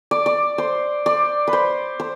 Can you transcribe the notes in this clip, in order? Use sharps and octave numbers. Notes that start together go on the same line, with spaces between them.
D5
D5
C5
D5
B4
C5
C5